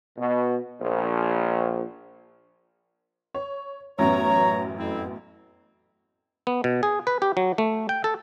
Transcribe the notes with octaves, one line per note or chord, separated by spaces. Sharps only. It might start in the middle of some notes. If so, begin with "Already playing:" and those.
B2
A#1
C#5
A1 F#2 B3 C#5 A#5
F2 C4 E4
B3
B2
G#4
B4
G4
F#3
A3
G5
A4